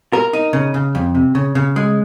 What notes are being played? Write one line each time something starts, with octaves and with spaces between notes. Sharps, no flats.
A#4
D#4
C#3
C#3
F2
C3
C#3
C#3
G#3